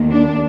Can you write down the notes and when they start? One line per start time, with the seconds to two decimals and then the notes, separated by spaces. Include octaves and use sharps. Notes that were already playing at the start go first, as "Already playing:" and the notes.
Already playing: D#2 D#3 A#3
0.11 D4